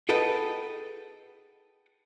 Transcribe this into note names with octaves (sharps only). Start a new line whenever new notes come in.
G#4 A4 B4 D#5 F#5 G5